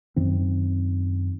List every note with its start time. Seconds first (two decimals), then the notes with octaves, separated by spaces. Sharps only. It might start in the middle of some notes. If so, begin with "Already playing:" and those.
0.16 F#2 D#3 C4